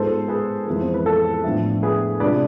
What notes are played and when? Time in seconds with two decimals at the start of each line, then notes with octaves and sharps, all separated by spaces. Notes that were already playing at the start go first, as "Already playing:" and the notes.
Already playing: G#2 G#3 B3 F4 A4 C5
0.28 G#4 B4
0.67 F2 E3 G#3 B3
0.81 C5
0.94 B4
1.06 A4
1.43 A2 F3 B3 D4
1.83 G#4 B4
2.20 C3 G#3 D4 F4 B4 D5